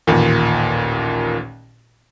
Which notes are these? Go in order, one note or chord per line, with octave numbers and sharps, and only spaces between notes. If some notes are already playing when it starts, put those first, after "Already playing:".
A1 D#2 A#2